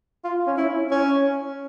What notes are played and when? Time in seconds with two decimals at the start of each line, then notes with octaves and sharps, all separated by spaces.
0.24 F4
0.47 C#4
0.57 E4
0.91 C#4